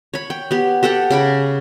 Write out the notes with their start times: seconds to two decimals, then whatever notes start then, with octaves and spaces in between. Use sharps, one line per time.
0.14 C#5 B5
0.30 G5
0.51 B3 G4
0.83 G4 A4 F#5 G5
1.10 C#3 B5 D6